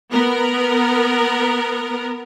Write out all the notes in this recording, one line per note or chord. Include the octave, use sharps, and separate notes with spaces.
B3 A#4